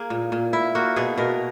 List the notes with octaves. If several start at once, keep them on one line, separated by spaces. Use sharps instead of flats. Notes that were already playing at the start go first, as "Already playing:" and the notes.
Already playing: A#3 G#4
A#2
A#2
E4
A#3 F#4
B2 G#4
B2 A#4